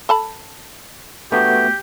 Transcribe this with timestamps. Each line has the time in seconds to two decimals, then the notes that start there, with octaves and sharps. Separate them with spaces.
0.09 A4 A5 B5
1.32 A3 B3 D4 F#4 G4